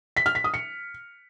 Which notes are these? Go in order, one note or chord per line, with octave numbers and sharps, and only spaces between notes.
B6
F6
B6
D#6
C#7